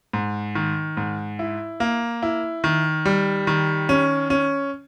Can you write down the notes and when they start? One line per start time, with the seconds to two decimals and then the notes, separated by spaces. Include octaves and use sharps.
0.13 G#2
0.55 D#3
0.97 G#2
1.39 E4
1.80 A#3
2.22 E4
2.64 D#3
3.05 G3
3.47 D#3
3.89 C#4
4.30 C#4